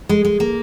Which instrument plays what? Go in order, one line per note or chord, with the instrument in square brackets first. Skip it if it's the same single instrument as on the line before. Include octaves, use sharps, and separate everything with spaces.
[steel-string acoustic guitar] G#3
G#3
A#3